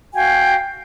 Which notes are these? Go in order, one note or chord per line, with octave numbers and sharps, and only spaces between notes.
F#4 F5 G5 G#5